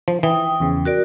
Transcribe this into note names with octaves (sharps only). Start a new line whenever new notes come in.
F3
E3 G5 D#6
E2 C#3
F#4 A#4 D5